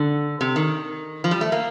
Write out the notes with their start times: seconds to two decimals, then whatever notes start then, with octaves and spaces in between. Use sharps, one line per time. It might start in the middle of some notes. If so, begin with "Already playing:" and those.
Already playing: D3
0.41 C3
0.56 D#3
1.24 F3
1.31 G3
1.41 A3
1.52 A#3